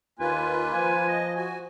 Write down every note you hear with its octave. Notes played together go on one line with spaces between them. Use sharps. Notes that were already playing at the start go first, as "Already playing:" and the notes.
D#2 A#3 F4 B4 G#5
F3 G#5
D#5
F#4 G#5